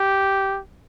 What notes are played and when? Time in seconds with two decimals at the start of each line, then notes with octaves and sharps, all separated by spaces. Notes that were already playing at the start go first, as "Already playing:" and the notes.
Already playing: G4